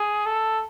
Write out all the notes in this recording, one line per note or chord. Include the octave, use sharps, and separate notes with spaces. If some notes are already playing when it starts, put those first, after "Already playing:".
Already playing: G#4
A4